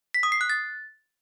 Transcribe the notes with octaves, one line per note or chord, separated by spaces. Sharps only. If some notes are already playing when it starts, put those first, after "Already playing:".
B6
D#6
C7
F#6
A6